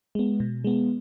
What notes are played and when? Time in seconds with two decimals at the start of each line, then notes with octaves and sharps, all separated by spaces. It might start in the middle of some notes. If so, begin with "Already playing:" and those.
0.15 G#3 B3
0.40 B2
0.64 G#3 B3